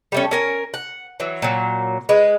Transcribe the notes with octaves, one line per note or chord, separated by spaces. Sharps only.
G3 A3 C#4
C#4 A#4 G#5
F#5
E3 F#3
A#2 F#3
G#3 B4